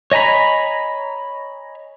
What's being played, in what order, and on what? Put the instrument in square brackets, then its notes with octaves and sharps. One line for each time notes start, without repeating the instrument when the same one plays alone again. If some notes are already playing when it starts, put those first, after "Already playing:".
[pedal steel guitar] C#5 D#5 G#5 A#5 B5